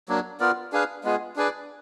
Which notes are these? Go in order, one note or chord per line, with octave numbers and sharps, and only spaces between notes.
F#3 A#3 D4
B3 F4 A#4 D5
D4 G#4 B4 F5
G#3 B3 F4 G#4
D4 G#4 B4 D5